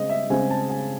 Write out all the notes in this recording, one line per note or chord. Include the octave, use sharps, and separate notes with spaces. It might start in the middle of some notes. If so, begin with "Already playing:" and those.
Already playing: C#3 G#3 C4 D#5
E5
C#3 G#3 C4 G#5
A5
G#5